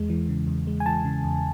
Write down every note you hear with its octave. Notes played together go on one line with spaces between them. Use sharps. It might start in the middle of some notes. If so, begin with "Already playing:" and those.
Already playing: E2 G#3
E3
C#3
E2
G#3
G#5
E3 A5
C#3
E2